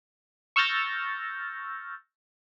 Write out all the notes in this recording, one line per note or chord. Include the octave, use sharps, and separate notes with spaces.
C#6 E6 F6 G6 A6 A#6